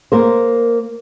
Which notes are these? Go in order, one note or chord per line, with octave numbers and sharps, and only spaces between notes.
A#3 A#4 C5